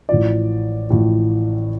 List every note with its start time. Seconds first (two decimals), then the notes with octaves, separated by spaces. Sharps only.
0.09 A1 A2 F3 D5
0.89 A1 A2 F3